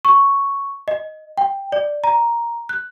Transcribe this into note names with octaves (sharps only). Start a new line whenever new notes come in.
C#6
D#5
G5
D5
A#5
F#6